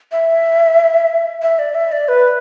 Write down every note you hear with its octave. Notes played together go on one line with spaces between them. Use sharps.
E5
E5
D5
E5
D5
B4